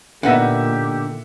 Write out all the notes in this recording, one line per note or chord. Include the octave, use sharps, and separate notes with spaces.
A#2 D3 B3 D#4 G4 E5 F#5